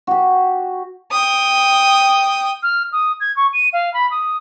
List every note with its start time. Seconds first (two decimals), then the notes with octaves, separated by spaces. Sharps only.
0.07 F#4 G4
1.12 G5 D#6
2.63 F6
2.92 D#6
3.20 G#6
3.36 C#6
3.53 D#7
3.73 F5
3.94 B5
4.11 D#6